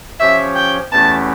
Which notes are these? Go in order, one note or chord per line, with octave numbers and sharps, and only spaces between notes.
F3 C#4 G4 C#5 E5
G5
E2 E3 A3 C#4 G4 A5